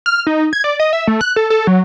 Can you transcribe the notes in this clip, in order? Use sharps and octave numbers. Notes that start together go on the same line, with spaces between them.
F6
D#4
G#6
D5
D#5
E5
A3
F#6
A4
A4
F#3